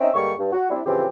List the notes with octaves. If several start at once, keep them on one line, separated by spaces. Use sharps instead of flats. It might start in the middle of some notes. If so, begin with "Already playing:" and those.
C4 C#4 D#4 D#5 E5
G2 D3 G3 G#3 A#3 C#6
G2
F#4
G3 C4 D4 E4
A2 C#3 E3 F3 C4 G4